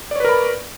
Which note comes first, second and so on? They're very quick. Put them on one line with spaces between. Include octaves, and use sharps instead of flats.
D5 C#5 B4 A#4 B5